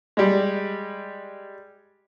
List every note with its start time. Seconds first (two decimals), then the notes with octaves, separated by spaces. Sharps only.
0.17 G3 G#3